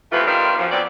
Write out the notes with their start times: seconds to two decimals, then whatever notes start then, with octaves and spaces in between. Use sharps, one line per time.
0.12 F2 C3 E3 A3 F4 B4
0.27 D#3 G3 B3 F4 D5
0.58 F#2 F3
0.71 F#3 B3 C4 D5